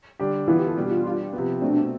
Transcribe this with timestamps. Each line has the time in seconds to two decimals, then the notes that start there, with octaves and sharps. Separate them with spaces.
0.19 D3 G3 D4 G4
0.47 E3 B3 E4 F4
0.58 G4
0.67 A4
0.77 B2 G3 D4 G4
0.91 F4
1.05 G3 D4 G4
1.33 C3 F3 B3
1.61 B2 A3 C4 D4